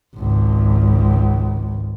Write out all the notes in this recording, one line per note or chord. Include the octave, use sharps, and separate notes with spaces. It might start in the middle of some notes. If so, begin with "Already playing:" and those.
G#1 C#2